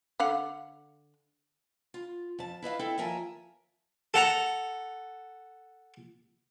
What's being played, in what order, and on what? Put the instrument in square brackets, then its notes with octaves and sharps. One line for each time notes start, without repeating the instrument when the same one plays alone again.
[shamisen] D3 F5 F#5
[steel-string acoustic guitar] F4
F2 A5
E4 B4 D#5 F5
C4 E4 A4
D#2 F3 A#4 E5 G#5
[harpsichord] A4 F#5 A#5